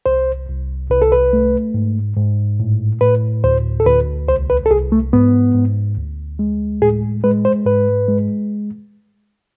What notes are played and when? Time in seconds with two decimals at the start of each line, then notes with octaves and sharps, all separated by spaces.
0.06 C2 C5
0.49 C2
0.90 C2 B4
1.02 A4
1.12 B4
1.33 A3
1.74 G#2
2.17 G#2
2.60 A2
3.01 A2 B4
3.44 D2 C5
3.80 A4
3.86 D2 B4
4.28 C2 C5
4.50 B4
4.66 A4
4.70 C2 G#4
4.92 A3
5.13 G#2 B3
5.55 G#2
5.97 D2
6.39 G#3
6.82 A2 G#4
7.24 G#3 B4
7.45 C5
7.66 G#2 B4
8.08 G#3